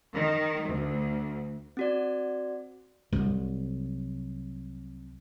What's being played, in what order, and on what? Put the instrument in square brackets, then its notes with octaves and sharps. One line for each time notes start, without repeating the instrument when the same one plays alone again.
[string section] D#3
D2
[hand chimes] C4 F#4 D5
[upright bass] C2 F#3